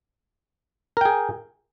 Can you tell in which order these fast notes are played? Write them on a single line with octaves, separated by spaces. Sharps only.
A#4 G5 G#4